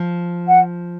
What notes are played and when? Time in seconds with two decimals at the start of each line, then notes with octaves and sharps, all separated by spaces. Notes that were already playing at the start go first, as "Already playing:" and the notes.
Already playing: F3
0.47 F#5